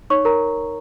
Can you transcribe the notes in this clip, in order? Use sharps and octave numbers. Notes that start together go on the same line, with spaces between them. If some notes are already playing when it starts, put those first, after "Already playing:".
D#4 C#5 C#6
A#4 A#5